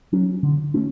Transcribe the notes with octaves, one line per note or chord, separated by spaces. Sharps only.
F#3 C#4
D3
A3 C#4